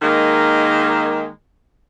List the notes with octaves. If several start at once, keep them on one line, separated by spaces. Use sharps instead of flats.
D#3 G#3 A#3